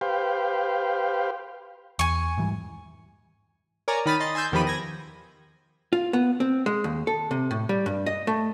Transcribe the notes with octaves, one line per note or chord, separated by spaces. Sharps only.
G4 B4 C5 F5 G5
E2 G#5 C#6
G#2 E3 G3
A#4 C#5 D5 G#5 A#5
D#3 D#4 B5 F6 A6 D#7
D#5 C6 A6
G#5 C6 E6 G6 A6
E2 D#3 F3 G4 B5 D#7
G#6 A#6
F4
B3
C4
G#3
D#2
A4
C3
A2
G3
G2
D#5
A3